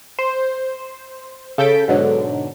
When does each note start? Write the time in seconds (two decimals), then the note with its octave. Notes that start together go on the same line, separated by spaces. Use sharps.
0.19 C5
1.58 C#3 A4 G6 A6 B6 D7
1.88 G#2 B2 D3 F#3